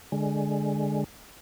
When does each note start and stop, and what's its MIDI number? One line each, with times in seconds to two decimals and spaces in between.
0.12 1.04 50
0.12 1.04 56